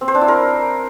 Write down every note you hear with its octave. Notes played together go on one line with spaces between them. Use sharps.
C4
C5
D4
E4
A#4